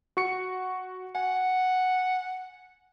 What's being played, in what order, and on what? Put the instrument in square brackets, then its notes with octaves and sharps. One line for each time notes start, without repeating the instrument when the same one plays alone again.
[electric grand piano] F#4 C#6 C#7
[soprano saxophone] F#5 [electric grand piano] G#5